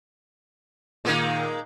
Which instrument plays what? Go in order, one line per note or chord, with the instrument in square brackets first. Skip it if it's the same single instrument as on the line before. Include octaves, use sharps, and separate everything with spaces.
[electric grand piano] A#2 D#3 [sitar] G#3 A#3 D#4